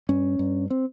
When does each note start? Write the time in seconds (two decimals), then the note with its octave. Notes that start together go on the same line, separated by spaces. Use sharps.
0.09 G2 C#4
0.39 G2
0.70 C4